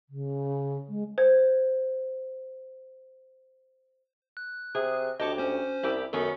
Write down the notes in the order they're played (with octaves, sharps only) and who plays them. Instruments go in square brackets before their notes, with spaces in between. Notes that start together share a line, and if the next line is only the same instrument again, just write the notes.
[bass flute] C#3
G#3
[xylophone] C5 G#6
[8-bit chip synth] F#6
[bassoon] C3 [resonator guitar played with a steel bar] G#4
[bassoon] D2 [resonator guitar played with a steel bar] G4 C#5 [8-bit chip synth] D#5 A5 D6
[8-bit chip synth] C#4 C5
[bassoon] C2 [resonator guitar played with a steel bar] E4 G4 D5
[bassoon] F#2 [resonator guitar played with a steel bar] D#3 B3 C#4 [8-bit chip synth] A4